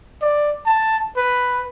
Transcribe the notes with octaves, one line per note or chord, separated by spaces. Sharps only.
D5
A5
B4